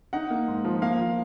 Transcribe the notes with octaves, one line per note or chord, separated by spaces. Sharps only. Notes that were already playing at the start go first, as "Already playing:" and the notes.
D#4 F#5
A#3
G#2
F3
A#3 F5
F3